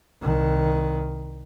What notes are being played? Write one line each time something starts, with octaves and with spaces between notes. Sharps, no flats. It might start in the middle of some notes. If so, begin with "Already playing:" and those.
C2 D#3